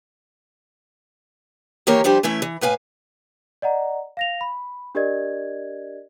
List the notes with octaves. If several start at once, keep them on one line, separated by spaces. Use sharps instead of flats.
D#3 E3 A#3 G4 A#4 C#5
F3 G3 D4 G4 C5
E3 A3 C#4 E4 E5
E3
A2 B4 F5 G#5
D5 D#5 F#5 A#5
F5 A#6 F7
B5
D4 G4 A#4 D5 D#5 G#6